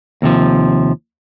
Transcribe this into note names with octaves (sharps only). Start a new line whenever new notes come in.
D#2 C3 F3